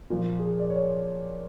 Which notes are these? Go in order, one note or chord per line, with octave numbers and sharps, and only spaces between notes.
A#2 F3
G#4
D5
C#5